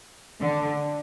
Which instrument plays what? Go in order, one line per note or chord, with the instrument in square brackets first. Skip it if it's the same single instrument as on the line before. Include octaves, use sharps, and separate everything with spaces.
[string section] D3